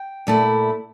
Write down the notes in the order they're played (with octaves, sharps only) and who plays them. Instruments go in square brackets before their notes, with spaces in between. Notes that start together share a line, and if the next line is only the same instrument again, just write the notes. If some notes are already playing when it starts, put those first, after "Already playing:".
Already playing: [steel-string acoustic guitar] G5
A#2 A3 E4